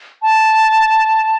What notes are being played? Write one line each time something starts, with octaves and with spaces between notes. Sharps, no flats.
A5